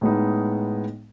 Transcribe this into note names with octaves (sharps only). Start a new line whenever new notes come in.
A2 G#3 B3 D#4